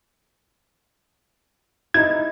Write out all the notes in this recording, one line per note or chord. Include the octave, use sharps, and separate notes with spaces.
D#4 E4 G#6